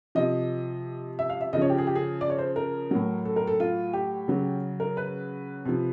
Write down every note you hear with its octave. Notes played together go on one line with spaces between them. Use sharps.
C3 F3 D#5
E5
F5
E5
C#3 F3 D#5
C#5
G4
G#4
G4
G#4
D5
C#5
C5
A#4
A2 F#3
A4
A#4
A4
F4
G4
C#3 F#3
A#4
B4
C3 F3